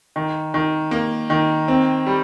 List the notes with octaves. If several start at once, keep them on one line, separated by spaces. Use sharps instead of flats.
D#3
D#3
A#3
D#3
C4
G3